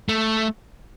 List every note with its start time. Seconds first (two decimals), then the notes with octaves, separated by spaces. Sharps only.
0.09 A3